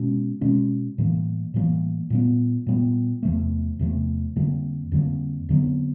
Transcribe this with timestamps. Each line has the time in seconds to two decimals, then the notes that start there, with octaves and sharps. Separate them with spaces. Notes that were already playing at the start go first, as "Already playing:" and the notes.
Already playing: B2 G#3 C#4
0.41 B2 G#3 C#4
0.98 A2 E3 G3 A#3
1.54 A2 E3 G3 A#3
2.10 A#2 G3 B3
2.67 A#2 G3 B3
3.23 E2 C3 F3 A3
3.79 E2 C3 F3 A3
4.36 F2 D3 G3 A#3
4.92 F2 D3 G3 A#3
5.49 F2 D3 F#3 B3